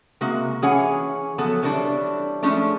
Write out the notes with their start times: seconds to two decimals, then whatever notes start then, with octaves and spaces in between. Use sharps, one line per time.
0.21 C3 G#3 A#3 F#4
0.62 E3 C#4 G#4 C#5 F#5 G#5
1.38 F3 F#3 B3 A4
1.63 E3 G3 D4 F#4 B4 C#5
2.43 F3 G#3 A3 C#4 D4